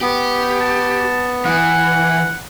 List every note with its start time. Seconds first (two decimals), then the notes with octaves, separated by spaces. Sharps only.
0.01 B3 G4
0.60 A5
1.46 E3 F#5